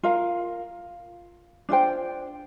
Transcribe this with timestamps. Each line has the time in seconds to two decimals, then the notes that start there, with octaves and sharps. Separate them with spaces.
0.03 F4 A#4 F5
1.69 D4 F4 C5 G5